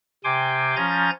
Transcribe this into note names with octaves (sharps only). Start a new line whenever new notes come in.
C3 G5 G#5 C6 D6
F3 C#4 G#5 A#5 G6 A6